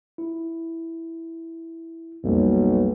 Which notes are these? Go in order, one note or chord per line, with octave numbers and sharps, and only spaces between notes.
E4
B1 F2 G3 A#3